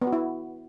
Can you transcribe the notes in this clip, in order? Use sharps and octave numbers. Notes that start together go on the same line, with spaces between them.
B3
F#4
E4